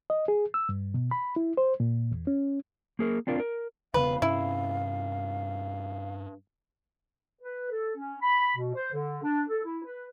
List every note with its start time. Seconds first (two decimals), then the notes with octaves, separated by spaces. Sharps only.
0.10 D#5
0.28 G#4
0.54 E6
0.69 G2
0.94 B2
1.11 B5
1.36 E4
1.57 C5
1.80 A#2
2.12 E2
2.27 C#4
2.99 A#3 G#4 A#4
3.27 C4 D4 F4 A#4 F5
3.40 A#4
3.94 E1 C#3 B3 B4 F5
4.22 G2 C3 C#4 E4
7.42 B4
7.70 A4
7.96 C#4
8.21 B5
8.56 B2
8.74 C5
8.93 D3
9.24 D4
9.48 A4
9.63 E4
9.84 B4